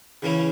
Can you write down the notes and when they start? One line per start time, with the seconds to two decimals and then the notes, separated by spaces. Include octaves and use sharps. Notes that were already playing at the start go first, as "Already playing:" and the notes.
0.22 C#3 E3 A#3 C#4 E4